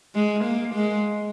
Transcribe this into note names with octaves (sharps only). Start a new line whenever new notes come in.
G#3
A#3
G#3